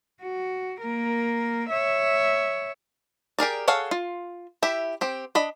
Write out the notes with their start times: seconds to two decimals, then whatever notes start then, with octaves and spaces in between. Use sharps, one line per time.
0.21 F#4
0.81 A#3 A#4
1.69 C#5 E5
3.39 G4 G#4 A#4 D5
3.68 G#4 A4 C#5 F5 F#5
3.91 F4
4.62 E4 G4 E5
5.01 C4 G4
5.35 D4 D#5 B5